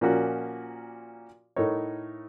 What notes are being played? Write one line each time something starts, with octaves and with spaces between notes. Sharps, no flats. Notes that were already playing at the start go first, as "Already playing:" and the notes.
A#2 F3 A#3 C#4 F#4
A2 A3 D#4 A#4 C#5